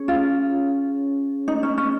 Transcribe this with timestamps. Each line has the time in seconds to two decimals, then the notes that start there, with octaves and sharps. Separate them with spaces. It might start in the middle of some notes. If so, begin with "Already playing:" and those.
Already playing: C#4 G#4 C#5
0.08 F4
1.48 D#4
1.63 C#4
1.78 C#4